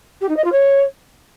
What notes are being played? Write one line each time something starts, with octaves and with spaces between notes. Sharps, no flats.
G4
D#4
D#5
F4
C#5